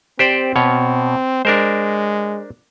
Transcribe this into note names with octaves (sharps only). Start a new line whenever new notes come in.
C4 G4 C5 D5
B2 C#5
G#3 D4 A#4 C5